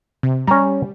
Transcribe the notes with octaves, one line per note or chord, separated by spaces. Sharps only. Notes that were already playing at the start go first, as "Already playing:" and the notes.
C3
G3 C#4 A#5